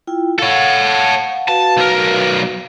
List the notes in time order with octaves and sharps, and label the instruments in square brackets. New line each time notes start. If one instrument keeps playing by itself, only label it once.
[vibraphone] E4 F4 G5
[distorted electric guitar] A4 C#5 [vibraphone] F5 F#5
[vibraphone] F#4 B4 F5 [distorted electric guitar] A5
[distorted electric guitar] B1 A#4